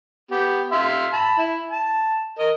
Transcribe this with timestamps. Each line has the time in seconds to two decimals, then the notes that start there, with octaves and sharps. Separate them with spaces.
0.31 B3 G4
0.72 E5 F5 C6
1.13 A5 B5
1.38 E4
1.70 A5
2.39 A#4 D#5